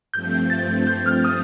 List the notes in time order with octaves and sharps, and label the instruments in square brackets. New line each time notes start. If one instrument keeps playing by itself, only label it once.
[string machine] G2 F3 A3 C4 [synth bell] G6
[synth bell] A6
G6
F6
D#6